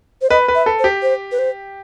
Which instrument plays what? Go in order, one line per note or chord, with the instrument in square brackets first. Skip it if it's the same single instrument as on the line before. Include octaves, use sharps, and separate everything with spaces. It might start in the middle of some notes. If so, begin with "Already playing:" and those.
[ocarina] C5
[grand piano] B4 [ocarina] D#5
[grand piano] B4
[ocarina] E5
[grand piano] A4
[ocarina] C5
[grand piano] G4
[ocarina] C5
B4
C5